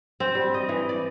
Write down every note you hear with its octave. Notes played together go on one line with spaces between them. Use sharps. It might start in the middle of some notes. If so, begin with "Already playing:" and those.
C4
G3
D#5
E3
D5